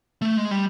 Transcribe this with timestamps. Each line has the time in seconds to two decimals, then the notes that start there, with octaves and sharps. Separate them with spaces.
0.22 A3
0.37 G#3
0.51 G3